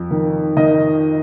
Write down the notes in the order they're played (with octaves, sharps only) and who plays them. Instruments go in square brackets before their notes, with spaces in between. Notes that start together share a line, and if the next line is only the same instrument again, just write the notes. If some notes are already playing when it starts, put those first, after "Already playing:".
Already playing: [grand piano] F2
D#3
D#3 D#5